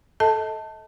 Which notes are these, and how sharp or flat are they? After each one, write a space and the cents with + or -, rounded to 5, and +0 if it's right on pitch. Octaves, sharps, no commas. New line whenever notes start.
A4 -10 D#5 +35 A5 +10